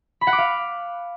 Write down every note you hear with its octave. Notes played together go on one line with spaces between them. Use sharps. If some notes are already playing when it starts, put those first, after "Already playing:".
B5
F#5
D6
F5